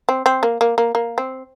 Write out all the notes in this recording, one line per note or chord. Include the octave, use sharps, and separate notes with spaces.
C4
C4
A#3
A#3
A#3
A#3
C4